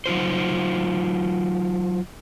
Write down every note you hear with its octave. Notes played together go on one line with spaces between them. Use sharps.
F#3 D#4 F4 C5